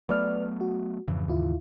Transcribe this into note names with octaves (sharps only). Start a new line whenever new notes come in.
F#3 A3 B3 B4 D5 F6
F#4
F2 G#2 C#3 E3
D#2 E4 F4